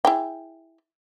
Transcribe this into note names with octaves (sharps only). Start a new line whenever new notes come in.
E4 G#4 G5